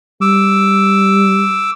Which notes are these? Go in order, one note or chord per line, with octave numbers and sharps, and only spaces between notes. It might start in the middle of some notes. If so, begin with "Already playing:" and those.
G3 D6 E6